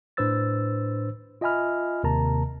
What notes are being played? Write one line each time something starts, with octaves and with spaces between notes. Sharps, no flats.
A2 D4 B4 C5 E6 A6
F4 D#5 E5 G#5 B5 F6
D#2 C3 A#4 A5 A#5